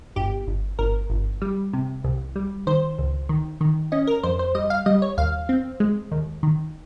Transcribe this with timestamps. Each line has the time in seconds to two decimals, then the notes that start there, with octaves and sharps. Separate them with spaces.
0.16 G1 G4
0.48 G1
0.79 G1 A#4
1.10 G1
1.42 G3
1.73 C3
2.04 C2
2.36 G3
2.67 D#3 C5
2.98 C#2
3.29 D#3
3.61 D#3
3.92 C#4 D#5
4.07 A#4
4.23 F2 C5
4.39 C5
4.55 G3 D#5
4.70 F5
4.86 G3 D#5
5.02 C#5
5.18 D#2 F5
5.49 C4
5.80 G#3
6.12 D#2
6.43 D#3